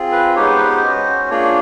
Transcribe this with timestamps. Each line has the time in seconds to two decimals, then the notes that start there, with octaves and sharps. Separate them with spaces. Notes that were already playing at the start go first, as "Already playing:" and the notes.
Already playing: C4 F4 G#4
0.12 B4
0.35 G#3 B3 D#4 G4 C#5
0.47 C5
0.58 B4
0.70 C5
0.83 C#4 F#4
1.30 A#3 D4 F4 G#4 C#5